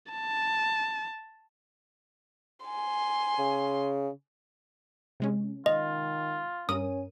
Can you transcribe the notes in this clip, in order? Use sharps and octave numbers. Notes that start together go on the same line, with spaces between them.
A5
G#5 C6
C#3
C3 G#3 C#4
D#3 F4 D#5
G2 C#4 A#4 D#6 D#7